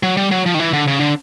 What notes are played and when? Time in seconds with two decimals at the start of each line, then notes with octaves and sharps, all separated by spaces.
0.03 F#3
0.17 G3
0.31 F#3
0.46 F3
0.54 D#3
0.59 E3
0.73 D3
0.88 C#3
0.99 D3